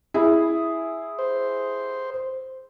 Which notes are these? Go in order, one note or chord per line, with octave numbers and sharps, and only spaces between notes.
E4 G#4
C5